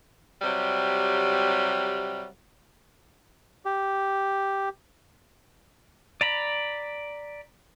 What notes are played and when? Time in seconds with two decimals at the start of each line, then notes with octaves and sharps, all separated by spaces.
0.42 C3 F#3 G3
3.65 G4
6.21 D5 A#5 B5